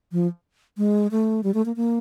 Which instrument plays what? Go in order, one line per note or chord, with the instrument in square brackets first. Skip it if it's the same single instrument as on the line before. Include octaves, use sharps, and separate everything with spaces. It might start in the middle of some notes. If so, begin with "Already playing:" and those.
[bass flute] F3
G#3
A3
G3
A3
A#3
A#3